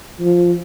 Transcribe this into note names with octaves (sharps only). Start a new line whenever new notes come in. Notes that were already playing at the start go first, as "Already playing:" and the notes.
F3